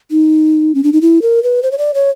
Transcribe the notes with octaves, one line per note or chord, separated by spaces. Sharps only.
D#4
C#4
D4
D#4
E4
A#4
B4
C5
C#5
D5
C#5